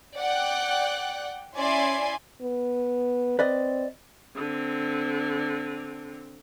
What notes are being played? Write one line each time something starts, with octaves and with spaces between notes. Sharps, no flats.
D5 F#5 G5 F#6
C#4 E4 D5 E5 G#5 C6
B3
C4 B4 D5 D#5
D3 C4